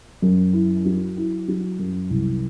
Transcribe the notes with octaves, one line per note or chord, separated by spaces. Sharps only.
F#2
E4
F#3
E4
F#3
F#2
C2